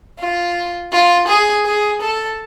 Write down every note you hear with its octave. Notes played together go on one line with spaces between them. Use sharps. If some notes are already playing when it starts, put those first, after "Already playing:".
F4
F4
G#4
G#4
A4